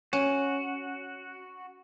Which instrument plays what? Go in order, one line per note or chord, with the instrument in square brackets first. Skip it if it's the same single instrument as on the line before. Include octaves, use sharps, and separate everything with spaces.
[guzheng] C#4 [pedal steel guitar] F#4